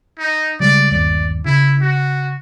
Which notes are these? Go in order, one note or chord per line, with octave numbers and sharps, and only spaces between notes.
D#4
C#3 G3 G#3 D5
G1 D#2 D5
C#3 E4
F#4